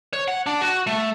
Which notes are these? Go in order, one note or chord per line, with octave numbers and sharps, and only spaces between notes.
C#5
F#5
D4
F#4
A3